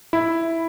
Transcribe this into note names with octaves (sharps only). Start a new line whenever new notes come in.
E4